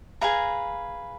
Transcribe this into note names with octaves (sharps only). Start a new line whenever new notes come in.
G#4 B4 F5 A#5